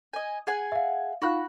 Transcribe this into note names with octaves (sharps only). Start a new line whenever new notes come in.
D#5 G#5
G#4 F#5 G#5
E5 F5
D#4 F4 F#4 F5 B5 F#6